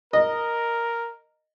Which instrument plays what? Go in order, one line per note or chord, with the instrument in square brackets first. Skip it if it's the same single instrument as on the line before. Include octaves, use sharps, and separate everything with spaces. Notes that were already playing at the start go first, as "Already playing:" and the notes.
[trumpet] A#4 [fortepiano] D#5